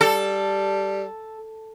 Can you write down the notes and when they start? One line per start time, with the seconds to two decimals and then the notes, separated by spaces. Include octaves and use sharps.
0.01 G3 A4